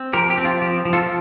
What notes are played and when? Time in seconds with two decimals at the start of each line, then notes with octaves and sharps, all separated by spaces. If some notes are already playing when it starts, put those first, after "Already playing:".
Already playing: C4
0.13 F3 G4 A#4
0.30 G4
0.38 C4
0.45 F4
0.62 F3 G4
0.85 F3
0.93 F4 A4